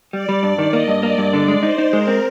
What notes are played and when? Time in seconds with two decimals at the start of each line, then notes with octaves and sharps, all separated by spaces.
0.13 G3 D5
0.29 G3
0.43 G2
0.58 D#3
0.73 A#3 D#5
0.88 G2
1.03 A#3 D5
1.18 G2
1.33 D3 D5
1.48 G#3
1.63 D#4 C5
1.78 D#4
1.93 G#3 A#4
2.08 C4